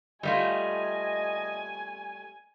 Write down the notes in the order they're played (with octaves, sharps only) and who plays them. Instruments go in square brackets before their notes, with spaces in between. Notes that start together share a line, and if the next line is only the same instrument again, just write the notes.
[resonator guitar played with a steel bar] G3 A3 F4 [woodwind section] D#5 [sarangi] G#5